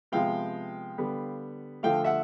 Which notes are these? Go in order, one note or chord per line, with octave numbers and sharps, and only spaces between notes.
C3 F3 G#3 B3 F5 G5
D3 G3 B3
D3 F3 A3 F5 G5
E5 F#5